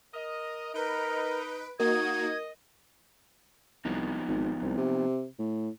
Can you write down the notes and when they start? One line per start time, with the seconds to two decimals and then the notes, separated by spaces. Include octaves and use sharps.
0.14 A#4 D#5
0.74 D#4 A#4 B4 D7
1.80 A#3 D#4 F#4 A#4 D#5 G#6
3.85 C2 F3 B3 D#4
4.28 G#1
4.62 C2
4.78 C3
5.39 A2